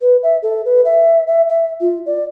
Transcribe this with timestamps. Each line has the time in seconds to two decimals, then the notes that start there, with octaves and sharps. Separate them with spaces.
0.01 B4
0.23 E5
0.43 A4
0.65 B4
0.85 E5
1.27 E5
1.49 E5
1.81 F4
2.06 D5